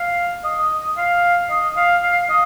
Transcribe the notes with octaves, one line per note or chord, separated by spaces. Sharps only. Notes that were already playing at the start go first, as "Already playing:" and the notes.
Already playing: F5
D#5
F5
D#5
F5
F5
D#5